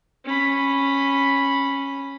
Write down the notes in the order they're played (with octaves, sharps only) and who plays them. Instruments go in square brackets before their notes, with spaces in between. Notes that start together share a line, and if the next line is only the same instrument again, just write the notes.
[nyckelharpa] C#4 B5